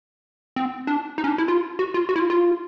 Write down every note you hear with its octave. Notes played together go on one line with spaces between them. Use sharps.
C4
D4
D#4
C#4
D4
E4
F4
F#4
F4
F#4
E4
F4
F4